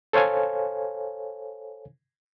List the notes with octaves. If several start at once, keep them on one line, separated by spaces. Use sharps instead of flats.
A4 C5 C#5 F5 G#5